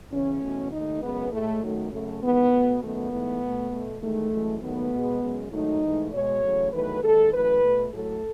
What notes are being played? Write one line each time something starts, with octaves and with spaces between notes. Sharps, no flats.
E2 C#3 E3 C#4
E2 B2 A3
D#2 D#3 A3 D#4
F#2 C#3 G#3 B3
A2 G#3 A3
F#2 D#3 F#3 A3
F#2 C#3 F#3 A3
E2 D#3 G#3 B3
B2 A3
F#2 D#3 A3 B3
G#2 E3 A3
B2 A3
B2 A3
E2 D#3 G#3 A3
F#2 E3 G#3
D#2 D#3 F#3 A3 B3
B2 G#3
F#2 C#3 G#3
G#2 D#3 F#3 A3 D#4
G#2 E3 A3
B2 G#3 C#5
E2 C#3 F#3 A3
E2 D#3 F#3 A3 B4
D#2 D#3 G#3 A4
F#2 E3 A3 B4
B2 A3
A2 F#3 A3 A4